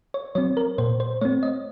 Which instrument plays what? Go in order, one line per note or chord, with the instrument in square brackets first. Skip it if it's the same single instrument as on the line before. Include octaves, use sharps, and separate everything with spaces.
[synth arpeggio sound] C#5
F#3 C4 C#5
A#4
A#2 C5
C5
A3 C4 C#5
D#5